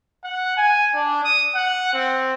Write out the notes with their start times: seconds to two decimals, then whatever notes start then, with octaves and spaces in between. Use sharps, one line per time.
0.24 F#5
0.57 G#5
0.94 D4
1.24 D#6
1.55 F#5
1.93 C4